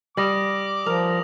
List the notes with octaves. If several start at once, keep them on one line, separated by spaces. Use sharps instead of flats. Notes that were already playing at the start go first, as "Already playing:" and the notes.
G3 D6 D#6 A#6 F#7
F3 A#4 F7